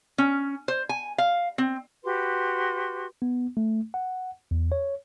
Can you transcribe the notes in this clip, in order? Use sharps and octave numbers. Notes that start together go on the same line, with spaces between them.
C#4
C5
G#5
F5
C4
F#4 G4 B4 C6
B3
A3
F#5
E2
C#5